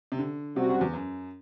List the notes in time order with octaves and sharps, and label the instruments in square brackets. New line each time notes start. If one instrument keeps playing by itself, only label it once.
[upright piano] C3
D3
[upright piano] C3 [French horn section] G3 C4 F#4
[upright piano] F#2
E2
F#2